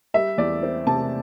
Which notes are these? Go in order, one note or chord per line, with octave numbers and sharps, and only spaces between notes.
G3 E5
E2 D5
C4
C3 A5